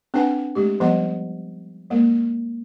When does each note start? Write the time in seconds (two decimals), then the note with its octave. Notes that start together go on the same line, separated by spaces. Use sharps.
0.14 C4 D4 D#4 B4 F#5 G#5
0.55 G#3 A3 G4
0.80 F3 G3 B3 D#5 F#5 A#5
1.90 G#3 A#3 A#4